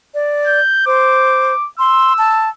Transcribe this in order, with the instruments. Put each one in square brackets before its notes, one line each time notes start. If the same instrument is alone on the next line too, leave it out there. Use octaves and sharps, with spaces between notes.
[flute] D5
[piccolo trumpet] G6
[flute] C5 [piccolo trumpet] D6
[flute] C6 [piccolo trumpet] E6
[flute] A5